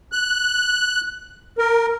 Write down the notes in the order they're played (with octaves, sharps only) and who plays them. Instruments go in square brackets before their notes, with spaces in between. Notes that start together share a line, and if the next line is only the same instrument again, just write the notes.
[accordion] F#6
A#4